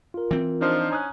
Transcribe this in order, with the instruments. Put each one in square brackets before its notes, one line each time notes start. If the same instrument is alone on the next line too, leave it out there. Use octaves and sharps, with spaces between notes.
[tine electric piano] F4 A#4
[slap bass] E3 C4
[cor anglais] F3 [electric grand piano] D4 D#4 C5
[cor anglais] C#4 [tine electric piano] A#5 D#6 F#6